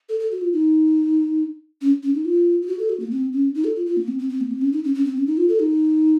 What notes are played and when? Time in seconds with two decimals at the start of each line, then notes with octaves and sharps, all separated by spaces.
0.09 A4
0.20 A4
0.31 F#4
0.41 F4
0.53 D#4
1.81 C#4
2.03 C#4
2.14 D#4
2.25 F4
2.62 F4
2.67 F#4
2.79 A4
2.89 F#4
3.00 A#3
3.11 C4
3.33 C#4
3.55 D#4
3.64 A4
3.76 F4
3.86 F4
3.97 A#3
4.08 C4
4.19 C4
4.29 C4
4.40 A#3
4.51 C4
4.61 C#4
4.73 D#4
4.84 C#4
4.95 C#4
5.05 C4
5.16 C#4
5.27 D#4
5.37 F4
5.49 A4
5.60 D#4